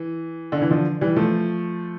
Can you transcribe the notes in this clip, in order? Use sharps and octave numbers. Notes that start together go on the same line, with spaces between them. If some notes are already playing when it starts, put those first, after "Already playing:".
Already playing: E3
D3
E3
D3 F3
E3 G3
F3 A3